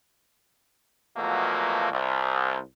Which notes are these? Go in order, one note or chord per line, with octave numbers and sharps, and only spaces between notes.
E2 B2 F3 F#3 A3 A#3
C2